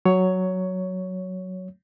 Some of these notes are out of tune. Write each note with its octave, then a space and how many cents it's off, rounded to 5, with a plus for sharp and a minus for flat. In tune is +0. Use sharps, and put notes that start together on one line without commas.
F#3 +0 C#5 +10